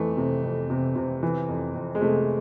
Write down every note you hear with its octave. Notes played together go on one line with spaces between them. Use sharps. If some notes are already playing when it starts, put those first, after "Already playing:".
Already playing: F2 E3 A3
C3
F2
C3
C3
E3
F2
F2
G#3
C3 A3